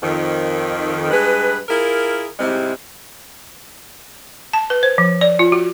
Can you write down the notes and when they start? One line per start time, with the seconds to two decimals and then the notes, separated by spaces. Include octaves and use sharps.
0.03 F2 D#3
1.11 G2 G#3 G#4 B4
1.69 E4 F4 G#4 A#4
2.39 G#2 C3 G3 G#3 C4 E4
4.53 A5
4.70 B4
4.83 C5
4.98 F3
5.21 D5
5.39 F4
5.52 F#4